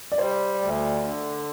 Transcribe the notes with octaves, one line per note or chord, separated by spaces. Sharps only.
D5
G3 C5
D2
D3